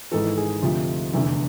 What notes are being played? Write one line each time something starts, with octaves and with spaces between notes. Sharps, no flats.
G#1 G#2 E3 A4
G#4
D2 C3 F3 F4
F1 E2 D3 E4